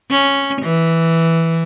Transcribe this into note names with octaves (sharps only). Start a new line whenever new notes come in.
C#4
E3